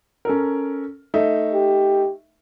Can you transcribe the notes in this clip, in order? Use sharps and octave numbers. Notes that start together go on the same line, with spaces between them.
C#4 A4 A#4
A3 D#4 E5
G4